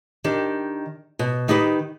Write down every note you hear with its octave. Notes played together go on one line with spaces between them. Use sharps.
D#3 D4 G4
B2
D#3 D#4 G4 B4